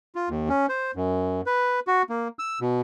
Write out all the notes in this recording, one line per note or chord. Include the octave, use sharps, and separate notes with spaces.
F4
D#2
C#4
C5
F#2
B4
F#4
A#3
E6
B2